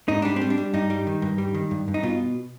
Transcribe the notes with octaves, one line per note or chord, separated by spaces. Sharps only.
G#2 D#4
G3 D4
C4
G3
D4
G3
G2 D#4
G3
D#3
G2
G3
D#3
G2
G2
D#4
B2 F4